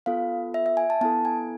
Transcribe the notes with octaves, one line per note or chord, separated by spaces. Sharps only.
B3 F4 A4 F5
E5
E5
G#5
A5
B3 E4 A4 A5
G#5